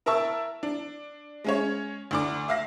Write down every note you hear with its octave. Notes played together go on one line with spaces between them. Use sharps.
E4 A#4 E5 A5 C#6 E6
D4
G#3 C#4 C#5
D2 D4 D6
E5 F5 A#6